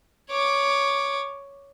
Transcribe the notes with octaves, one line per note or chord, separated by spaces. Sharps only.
C#5 D6